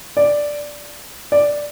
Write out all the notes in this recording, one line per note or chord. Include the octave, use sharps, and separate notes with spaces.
D5
D5